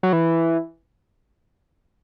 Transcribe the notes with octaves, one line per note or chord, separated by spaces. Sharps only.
F#3
E3